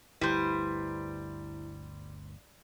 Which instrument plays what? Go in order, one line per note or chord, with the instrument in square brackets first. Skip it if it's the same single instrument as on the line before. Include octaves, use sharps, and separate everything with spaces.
[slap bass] G1 D2 [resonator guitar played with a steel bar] G3 [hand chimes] E4 [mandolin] B4 C5